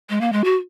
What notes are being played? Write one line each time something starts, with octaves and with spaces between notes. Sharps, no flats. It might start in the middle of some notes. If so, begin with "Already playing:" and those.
G#3
A#3
G#3
F#4